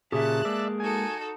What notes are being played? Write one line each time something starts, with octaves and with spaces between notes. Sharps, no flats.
A#2 C#3 G4 G#4 E5 A5 F#6
G#3 A#3 D5 E5
D#4 F#4 A4 G#5